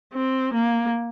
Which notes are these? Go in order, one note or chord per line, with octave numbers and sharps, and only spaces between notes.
C4
A#3